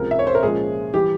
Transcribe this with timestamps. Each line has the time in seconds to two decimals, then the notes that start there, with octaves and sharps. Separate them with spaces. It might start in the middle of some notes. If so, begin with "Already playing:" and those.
Already playing: C#2 C3 F3 A#4
0.11 E5
0.19 C#5
0.27 C5
0.35 A#4
0.43 A#2 F3 G#3 C#4 G#4
0.94 E3 G3 G4